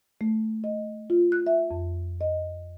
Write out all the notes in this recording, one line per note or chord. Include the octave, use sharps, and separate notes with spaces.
A3
D#5
F4
F#6
E5
F2
D#5